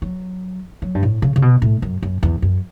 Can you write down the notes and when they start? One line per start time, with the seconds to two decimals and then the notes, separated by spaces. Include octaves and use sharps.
0.02 F#3
0.82 F#3
0.95 G2
1.03 A2
1.22 C#3
1.36 C#3
1.42 B2
1.62 A2
1.82 F#2
2.03 F#2
2.23 E2
2.42 F#2